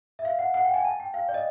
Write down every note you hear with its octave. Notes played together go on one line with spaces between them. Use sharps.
E5
F5
F#5
F#5
G5
G#5
A5
G5
F5
D5
D#5